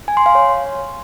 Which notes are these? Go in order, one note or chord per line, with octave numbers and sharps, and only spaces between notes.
G#5
C6
F5
C#5